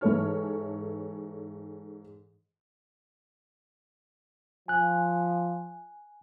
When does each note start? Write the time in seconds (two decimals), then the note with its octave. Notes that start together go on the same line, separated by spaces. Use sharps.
0.01 G#2 E3 A4 C#5 F6
4.68 F3 G#5 F#6